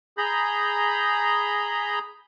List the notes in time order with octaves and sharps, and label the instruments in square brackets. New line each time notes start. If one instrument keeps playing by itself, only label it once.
[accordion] G#4 A#5 B5 G6